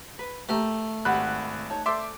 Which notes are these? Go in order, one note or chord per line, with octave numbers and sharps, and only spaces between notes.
B4
A3 G4 A#4
G#1 G4 C5 F#5 B5 F#6
D#4 C#5 A5
A4 C5 D5 E5 C6 D6